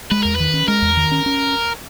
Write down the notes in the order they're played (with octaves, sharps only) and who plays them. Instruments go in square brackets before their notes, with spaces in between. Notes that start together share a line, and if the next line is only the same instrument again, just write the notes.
[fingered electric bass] G#3 [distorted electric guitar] B4
[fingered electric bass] E2 [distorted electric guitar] A#4
[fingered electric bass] D#3 [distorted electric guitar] B4
[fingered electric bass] C#4
[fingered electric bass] G#3 [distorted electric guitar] A#4
[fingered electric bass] E2
D#3
C#4
C#4